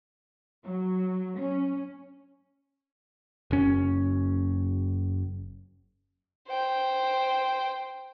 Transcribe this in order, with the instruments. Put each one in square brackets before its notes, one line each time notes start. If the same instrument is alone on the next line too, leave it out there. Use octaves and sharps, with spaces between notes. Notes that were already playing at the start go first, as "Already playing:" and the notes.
[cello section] F#3
C#4
[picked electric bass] F#1 C#4
[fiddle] C5 G5